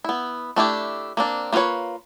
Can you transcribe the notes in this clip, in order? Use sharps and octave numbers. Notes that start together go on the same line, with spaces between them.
B3 E4
A3 D4 E4 G4
A#3 C4 D4
A#3 F4 A4 B4 C#5